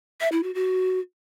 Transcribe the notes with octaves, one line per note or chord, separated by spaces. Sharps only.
E5
E4
F#4
F#4